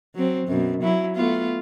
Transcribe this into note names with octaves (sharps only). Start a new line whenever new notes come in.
F#3 C4
F#2 B2
F#3 E4
A3 B3 F4